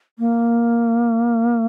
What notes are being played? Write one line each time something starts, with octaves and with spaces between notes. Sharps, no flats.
A#3